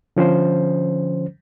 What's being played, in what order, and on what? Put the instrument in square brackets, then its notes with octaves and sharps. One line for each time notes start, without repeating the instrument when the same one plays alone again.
[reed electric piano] D3 F3 C#4 C5